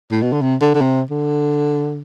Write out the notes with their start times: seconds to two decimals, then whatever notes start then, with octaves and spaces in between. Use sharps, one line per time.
0.11 A2
0.22 B2
0.33 D3
0.41 C3
0.61 D3
0.75 D3
0.81 C3
1.10 D3